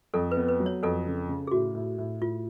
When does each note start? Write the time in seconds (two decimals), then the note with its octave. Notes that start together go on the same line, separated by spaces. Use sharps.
0.14 F2 A4
0.32 B4
0.37 B3
0.49 B4
0.60 F#3
0.66 C#5
0.83 F2 A4
1.07 C#3
1.29 C#3
1.47 G#4
1.52 A2 F#4
1.75 A2
1.98 A2
2.21 A2 F4